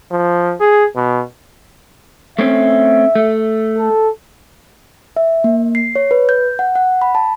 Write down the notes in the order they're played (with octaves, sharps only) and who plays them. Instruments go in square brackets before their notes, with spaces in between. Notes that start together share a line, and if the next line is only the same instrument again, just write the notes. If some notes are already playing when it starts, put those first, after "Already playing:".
[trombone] F3
G#4
B2
[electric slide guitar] A3 C4 C#4 [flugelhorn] E5
[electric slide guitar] A3
[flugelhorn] A4
[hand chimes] E5
A#3
C7
C#5
B4
G6
F#5
F#5
B5
A5